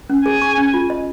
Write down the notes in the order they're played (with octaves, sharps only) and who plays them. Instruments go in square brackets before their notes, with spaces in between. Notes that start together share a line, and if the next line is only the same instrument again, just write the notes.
[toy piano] C#4
[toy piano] G#4 [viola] G#5
[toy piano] C#6
C#4
F4
D#5